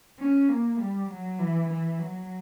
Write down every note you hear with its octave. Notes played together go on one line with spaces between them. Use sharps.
C#4
A#3
G3
F#3
E3
E3
F#3